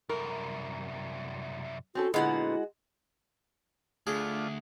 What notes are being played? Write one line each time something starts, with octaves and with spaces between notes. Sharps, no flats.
C2 F#2 A#4
C4 C#4 F#4 A4
A#2 D3 G#3 B3 E4 F#4 F#5
D2 A3 D4 F4 G#4